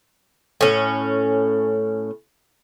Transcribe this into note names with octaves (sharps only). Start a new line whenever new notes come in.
A2 C#4